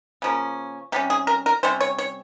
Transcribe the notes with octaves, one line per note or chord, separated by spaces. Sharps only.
C#3 F3 A#3 C#4
C3 G3 C#4 G4
G#4
A#4
A#4
C3 G3 C#4 C5
C#5
C#5